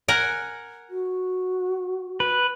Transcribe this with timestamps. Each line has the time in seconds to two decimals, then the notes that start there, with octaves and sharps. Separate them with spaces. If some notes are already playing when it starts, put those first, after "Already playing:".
0.08 A#4 F#5 G#5
0.90 F#4
2.20 B4